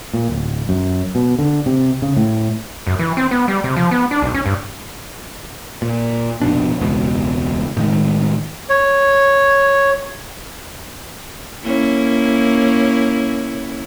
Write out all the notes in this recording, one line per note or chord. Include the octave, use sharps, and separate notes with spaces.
A#2
D1
F#2
B2
D3
C3
C#3
A2
F#2
E3
C4
B3
G3
C3
F3
B3
D4
B1
C#4
G2
A#2
F1 A#1 B2 D4
E1 C#2 B2
A2 D#3 G#3
C#5
A#3 C#4 E4